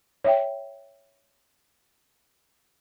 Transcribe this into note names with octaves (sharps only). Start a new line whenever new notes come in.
C#5 E5 G5